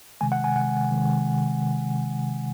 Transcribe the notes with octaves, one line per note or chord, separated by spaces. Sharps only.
C3 D#3 G#3 G#5
F#5
G#5
C3 D#3 G#3 F#5
C3 D#3 G#3